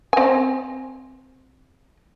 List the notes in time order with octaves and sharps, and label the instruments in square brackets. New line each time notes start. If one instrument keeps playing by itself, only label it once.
[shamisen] C4 G#5